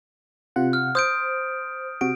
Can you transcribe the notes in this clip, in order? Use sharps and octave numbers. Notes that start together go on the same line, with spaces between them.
C3 F4 F#5
F6
C5 D#6 G6 D7
C3 F#4 D7